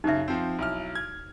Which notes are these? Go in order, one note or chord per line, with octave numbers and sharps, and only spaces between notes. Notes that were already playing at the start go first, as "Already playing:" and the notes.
F#2 C#3 D#4 E5
F3 C4
B1 E4 F6
G#6